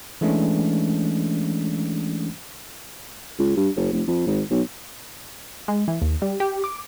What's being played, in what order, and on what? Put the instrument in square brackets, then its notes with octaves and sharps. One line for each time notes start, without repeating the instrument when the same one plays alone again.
[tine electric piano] E3 G#3 A3 C#4 D4
[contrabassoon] C#2
G2
F#1
F1
F2
G#1
B1
[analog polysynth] G#3
E3
D#2
G3
G4
D6